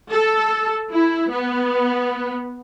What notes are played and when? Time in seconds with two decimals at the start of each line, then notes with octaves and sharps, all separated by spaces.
0.10 A4
0.92 E4
1.30 B3